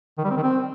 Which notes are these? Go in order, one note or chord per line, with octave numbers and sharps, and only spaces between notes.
D#3
G3
C4
D#3
C4